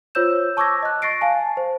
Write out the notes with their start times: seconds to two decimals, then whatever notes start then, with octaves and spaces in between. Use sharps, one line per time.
0.15 F4 C5 C#5 E6 G6 E7
0.57 A5 C#6 D6 E6 G#6 A#6
0.83 D#5 F#6
1.02 C#6 A6 A#6 C7 D7
1.21 F5 G#5 A5
1.57 C5